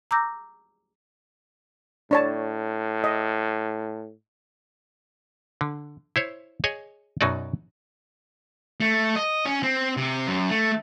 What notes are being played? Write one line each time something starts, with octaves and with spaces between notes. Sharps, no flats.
A#5 D6 E6 G6 A#6
A2 D4 C#5 A5
D#5
D3
E4 C5 C#5
G#4 C#5 D#5 G#5
F#2 B2 F#3 D#4 F#4 D5
A3
D#5
C#4
C4
C3
F#2
A3